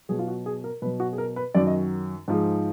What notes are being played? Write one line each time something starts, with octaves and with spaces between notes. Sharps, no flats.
B2 F#3 G#4
F4
F#4
G#4
A#4
B2 F#3 B4
F#4
G#4
A#4
B4
F#2 D#3 F#3 D5
D#5
G#2 F3 G#3